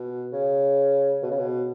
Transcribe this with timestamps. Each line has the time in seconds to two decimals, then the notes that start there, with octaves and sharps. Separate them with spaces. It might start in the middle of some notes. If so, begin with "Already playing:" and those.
Already playing: B2
0.33 C#3
1.23 B2
1.31 C#3
1.39 B2